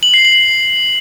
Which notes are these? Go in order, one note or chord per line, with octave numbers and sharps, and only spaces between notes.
F#7
C7
F#7